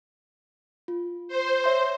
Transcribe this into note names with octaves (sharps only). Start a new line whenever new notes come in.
F4
C5
C#5 E5 C6